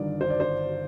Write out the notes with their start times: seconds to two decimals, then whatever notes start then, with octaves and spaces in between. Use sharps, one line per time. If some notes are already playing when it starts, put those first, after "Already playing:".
Already playing: G1 G2 D#3 D5
0.21 C5
0.30 D5
0.40 C5